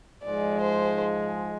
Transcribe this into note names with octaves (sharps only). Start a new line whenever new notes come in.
G#2 F3 G#3 D5
C5